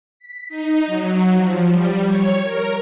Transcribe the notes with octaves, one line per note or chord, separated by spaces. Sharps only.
B6
D#4
F#3
F3
G3
C#5
A#4